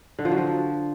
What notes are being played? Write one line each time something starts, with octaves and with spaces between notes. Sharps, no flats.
D3
F3
F#3
F3